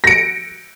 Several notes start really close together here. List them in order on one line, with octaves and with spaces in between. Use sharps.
A#6 D7 C#7